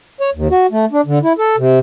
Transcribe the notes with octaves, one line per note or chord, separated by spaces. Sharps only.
C#5
D#2
F#4
A3
D4
D3
E4
A4
C3